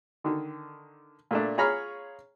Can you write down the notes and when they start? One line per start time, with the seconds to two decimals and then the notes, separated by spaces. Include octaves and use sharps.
0.24 D3 D#3
1.31 A#2 A3 D4
1.58 F4 G#4 C#5 A#5 B5 F6